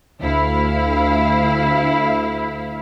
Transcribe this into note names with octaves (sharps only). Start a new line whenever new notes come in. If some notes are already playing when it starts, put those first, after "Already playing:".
D2 E4 F5